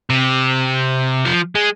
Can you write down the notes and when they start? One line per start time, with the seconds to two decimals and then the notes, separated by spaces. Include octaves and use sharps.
0.10 C3
1.25 F3
1.55 G#3